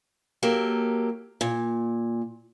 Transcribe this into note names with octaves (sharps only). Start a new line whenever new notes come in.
F#3 A#3 G4 A4
A#2